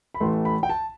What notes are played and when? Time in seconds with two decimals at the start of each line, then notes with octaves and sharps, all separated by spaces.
0.14 B5
0.20 A1 A2 E3 A3 C6
0.45 B5
0.63 G5
0.69 A5